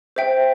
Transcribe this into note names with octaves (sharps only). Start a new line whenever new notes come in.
C5 E5 G5